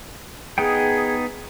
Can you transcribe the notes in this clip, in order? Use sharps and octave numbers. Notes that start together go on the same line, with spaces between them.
B3 D#4 G#4 G5